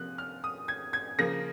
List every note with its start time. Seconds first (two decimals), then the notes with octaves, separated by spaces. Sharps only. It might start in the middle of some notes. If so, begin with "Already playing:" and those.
Already playing: C3 F3 A#3 F#6
0.18 F6
0.44 D#6
0.68 G#6
0.93 G#6
1.18 C#3 F3 A#3 A#6